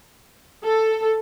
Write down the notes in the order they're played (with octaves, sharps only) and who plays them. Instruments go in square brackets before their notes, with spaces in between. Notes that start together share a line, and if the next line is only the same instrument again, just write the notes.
[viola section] A4